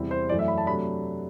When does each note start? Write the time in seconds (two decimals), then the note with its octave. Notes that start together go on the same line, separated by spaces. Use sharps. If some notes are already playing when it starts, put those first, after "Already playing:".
Already playing: E2 C3 G3 C4 E4
0.11 C5
0.29 F#2 E3 A3 D5
0.39 E5
0.48 B5
0.58 A5
0.67 C3 F#3 A3 D4 B5